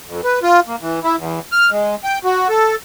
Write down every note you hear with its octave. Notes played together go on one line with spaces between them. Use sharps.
F2
B4
F4
A#3
E3
E4
E2
F6
G#3
G5
F#4
A4